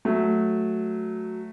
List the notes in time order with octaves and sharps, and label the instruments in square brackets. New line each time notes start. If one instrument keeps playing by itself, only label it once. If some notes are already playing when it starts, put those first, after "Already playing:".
[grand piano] F#3 A3